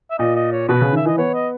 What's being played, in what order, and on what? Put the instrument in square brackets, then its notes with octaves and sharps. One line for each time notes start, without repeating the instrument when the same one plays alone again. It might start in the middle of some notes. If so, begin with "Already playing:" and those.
[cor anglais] E5
[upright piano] A#2 [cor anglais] D#5
[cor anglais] D#5
C#5
[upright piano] B2 [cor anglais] B4
[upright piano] C#3
[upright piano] D#3 [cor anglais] E5
[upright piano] E3 [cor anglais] D#5
[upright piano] B3 [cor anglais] C#5
[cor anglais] D#5